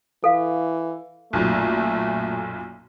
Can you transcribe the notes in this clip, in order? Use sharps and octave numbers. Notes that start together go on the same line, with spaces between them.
E3 A4 F5
B1 F#2 A#2 A3